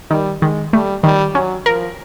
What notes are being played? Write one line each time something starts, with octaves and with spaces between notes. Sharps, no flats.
D#3 G3
D#3 G#3
G3 A3
D#3 G3
F#3 C#4
F3 A#4